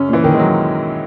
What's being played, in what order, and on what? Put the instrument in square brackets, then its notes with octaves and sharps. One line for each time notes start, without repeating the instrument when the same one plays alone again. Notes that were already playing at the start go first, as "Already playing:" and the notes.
Already playing: [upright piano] F#2 C#4 [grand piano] C#3
[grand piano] A#2 [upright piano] E3
[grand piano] D#3
[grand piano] F#3 [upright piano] G#3